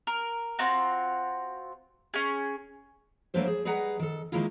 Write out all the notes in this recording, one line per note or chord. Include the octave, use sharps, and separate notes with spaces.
A#4
C4 F4 F#4 A#5
C#4 G#4
F#3 A3 A#3 D4 B4 C5
G#4
G3 G#4 B4 D#5 F#5 A#5
D#3 A4
D#3 F#3 G#3 A#3 E4 F4